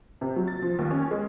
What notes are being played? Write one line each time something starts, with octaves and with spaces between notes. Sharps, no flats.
C3
F#3
A6
F3
D#2
C#4
G#3